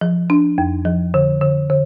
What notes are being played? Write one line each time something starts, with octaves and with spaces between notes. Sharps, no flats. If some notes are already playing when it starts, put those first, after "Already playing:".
F3
D4
F2
F3
D3
D3
D3